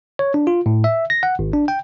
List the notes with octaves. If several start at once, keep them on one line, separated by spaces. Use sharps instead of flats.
C#5
D4
F4
A2
E5
A#6
F#5
G#1
D4
G5